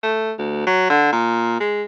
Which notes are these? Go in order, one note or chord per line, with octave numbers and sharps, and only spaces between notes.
A3
D2
F#3
D3
A#2
G#3